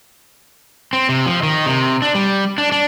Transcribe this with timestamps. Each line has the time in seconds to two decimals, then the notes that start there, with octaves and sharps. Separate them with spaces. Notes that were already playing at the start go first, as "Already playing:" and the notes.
0.93 C4
1.09 C3
1.26 F3
1.43 D#3
1.66 C3
2.02 D4
2.15 G3
2.58 D4
2.72 D4